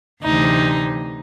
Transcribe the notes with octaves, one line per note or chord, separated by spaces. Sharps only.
D2 C3 E3 D#4